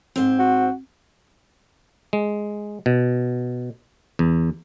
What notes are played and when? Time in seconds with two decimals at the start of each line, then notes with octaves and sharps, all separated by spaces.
0.16 G#2 C4
0.39 F#4
2.13 G#3
2.86 B2
4.19 E2